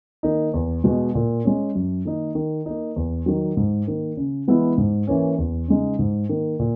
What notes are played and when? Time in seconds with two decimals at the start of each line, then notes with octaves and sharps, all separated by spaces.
0.23 D#3 A#3 D#4
0.54 E2
0.84 B2 G#3
1.15 A#2
1.44 G#3 C#4
1.75 F#2
2.05 D#3 A#3 D#4
2.35 D#3
2.66 A#3 D#4
2.96 E2
3.26 D#3 F#3
3.57 G#2
3.87 D#3 A#3
4.17 C#3
4.47 E3 G#3 B3 E4
4.78 G#2
5.07 E3 A#3 C#4
5.38 E2
5.68 C#3 G#3 D#4
5.99 G#2
6.29 D#3 A#3
6.59 A#2